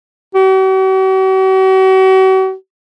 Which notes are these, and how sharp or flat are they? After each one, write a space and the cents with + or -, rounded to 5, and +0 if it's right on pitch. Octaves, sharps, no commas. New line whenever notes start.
F#4 +45